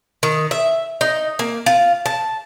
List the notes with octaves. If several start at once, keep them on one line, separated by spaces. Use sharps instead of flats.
D#3
E5
D#4
A#3
F4
A5